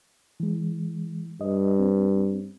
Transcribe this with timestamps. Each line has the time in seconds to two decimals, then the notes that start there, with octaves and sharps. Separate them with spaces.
0.40 E3 G#3
1.41 G2 D#5
1.79 C4